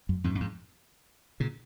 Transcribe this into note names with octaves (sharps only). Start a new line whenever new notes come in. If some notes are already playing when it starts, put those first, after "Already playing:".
F#2
F2 G#2
F#2
F2 G#2
A#2 C#3